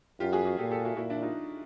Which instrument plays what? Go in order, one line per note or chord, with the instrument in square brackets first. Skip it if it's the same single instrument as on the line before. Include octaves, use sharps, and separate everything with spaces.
[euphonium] F#2 [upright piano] F4 G4
[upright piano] F#4 G#4
F#4 G#4
[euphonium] A#2 [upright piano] G4 A4
[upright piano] G4 A4
E4 F#4
[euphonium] A#2 [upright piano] E4 F#4
[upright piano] D4 E4
D#4 F4